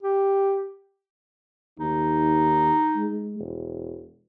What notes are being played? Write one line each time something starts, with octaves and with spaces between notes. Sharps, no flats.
G4
D#2 D#4
G#3
E1